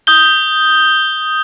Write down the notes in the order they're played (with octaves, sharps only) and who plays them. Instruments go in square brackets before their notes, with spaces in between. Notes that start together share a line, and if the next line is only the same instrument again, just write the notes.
[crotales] D#6 G6 G7